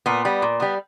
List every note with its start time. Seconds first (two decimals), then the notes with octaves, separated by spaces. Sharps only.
0.06 A#2 B3
0.25 G3 B3
0.42 A#2
0.60 G3 B3